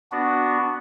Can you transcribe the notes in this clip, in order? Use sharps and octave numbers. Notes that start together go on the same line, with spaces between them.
B3 D4 F#4